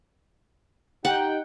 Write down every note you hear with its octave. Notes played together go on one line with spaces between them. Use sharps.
D#4 G4 F#5 G5